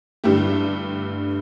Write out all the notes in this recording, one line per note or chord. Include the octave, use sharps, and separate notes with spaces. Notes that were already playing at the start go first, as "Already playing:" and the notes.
G2 D3 A3 E4 G4